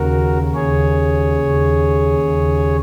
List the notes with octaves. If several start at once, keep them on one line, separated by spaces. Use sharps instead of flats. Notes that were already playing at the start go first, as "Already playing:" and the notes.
Already playing: D#2 C#3 F#4 A#4
D#2 C#3 G#4 C#5
D#2 C#3
D#2 C#3